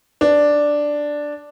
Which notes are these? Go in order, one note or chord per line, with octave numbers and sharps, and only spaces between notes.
D4